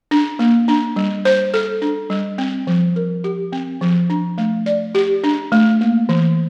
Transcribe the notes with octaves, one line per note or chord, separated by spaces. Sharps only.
D4
A#3
D4
G3
C5
A4
D4
G3
C4
F3
A#4
G4
C4
F3
D4
A3
D5
G4
D4
A3
A#3
E3